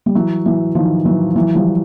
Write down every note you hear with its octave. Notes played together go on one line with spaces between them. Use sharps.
G3
E3 F#3
E3 F#3
D#3 F3
E3 F#3
E3 F#3
F3 G3